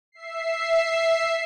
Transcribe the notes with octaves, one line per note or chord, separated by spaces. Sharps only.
E5 C7